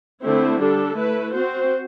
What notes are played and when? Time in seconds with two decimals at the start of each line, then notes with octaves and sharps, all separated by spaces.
0.23 D3 A3 C4 E4
0.60 G3 D4 A4
0.96 A3 E4 B4
1.34 C4 F#4 C5